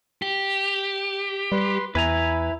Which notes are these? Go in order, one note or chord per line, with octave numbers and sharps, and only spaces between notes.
G4
G3 B4 C6
E2 E4 B4 G#5 A#5